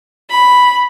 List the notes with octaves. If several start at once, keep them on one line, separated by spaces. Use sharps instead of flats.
B5